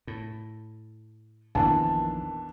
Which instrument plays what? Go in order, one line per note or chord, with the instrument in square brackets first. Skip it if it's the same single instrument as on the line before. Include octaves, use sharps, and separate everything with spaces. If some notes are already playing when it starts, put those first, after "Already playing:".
[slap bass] A2
[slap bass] A#1 F2 A#3 [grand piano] B2 E3 D4 [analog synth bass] D#3 [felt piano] A5